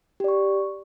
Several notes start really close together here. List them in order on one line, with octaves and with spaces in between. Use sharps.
G4 D5 C#6